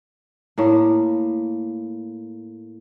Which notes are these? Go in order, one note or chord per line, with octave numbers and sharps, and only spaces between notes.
A2 A#3